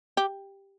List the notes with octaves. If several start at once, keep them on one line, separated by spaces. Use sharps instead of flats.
G4